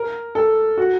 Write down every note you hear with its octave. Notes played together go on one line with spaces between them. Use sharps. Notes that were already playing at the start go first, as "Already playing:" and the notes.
Already playing: A#4
A4
F#4